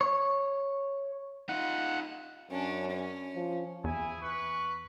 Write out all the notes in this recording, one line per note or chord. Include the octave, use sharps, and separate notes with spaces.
C#5
D#4 F4 F#5
F#2 C#4 D4
C#4
F3
E2 E4 G#4 G#5
B4 C#6